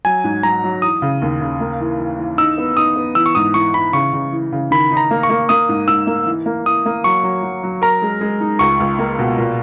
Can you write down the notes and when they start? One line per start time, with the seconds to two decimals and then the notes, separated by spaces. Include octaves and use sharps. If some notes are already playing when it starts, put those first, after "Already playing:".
0.05 F#3 G#5
0.24 G#2
0.43 F#3 A#5
0.64 F#3
0.82 E3 D#6
1.02 C#3
1.22 D#2
1.41 C#3
1.60 A#3
1.80 E3
2.00 E3
2.18 E3
2.38 D#4 E6
2.58 B3
2.77 D#4 D#6
2.96 B3
3.15 E3 E6
3.26 C#6
3.35 G#2 D#6
3.54 E3 C#6
3.74 E3 B5
3.93 C#3 C#6
4.13 C#3
4.32 E3
4.52 C#3
4.71 D#3 B5
4.91 D#4
4.97 A#5
5.11 A#3
5.23 C#6
5.30 A#3
5.49 A#3 D#6
5.69 G#2
5.88 G#2 E6
6.07 A#3
6.26 E3
6.46 A#3
6.65 E3 D#6
6.86 A#3
7.04 F#3 C#6
7.23 F#3
7.43 F#3
7.63 F#3
7.82 A#4 A#5
8.02 G#3
8.21 G#3
8.41 D#4
8.59 C#2 C#6
8.80 C#2
8.99 A#3
9.19 B2
9.38 A#2